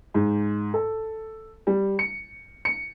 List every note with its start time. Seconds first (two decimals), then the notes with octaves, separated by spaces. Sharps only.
0.14 G#2
0.74 A4
1.67 G3
1.99 C#7
2.65 C#7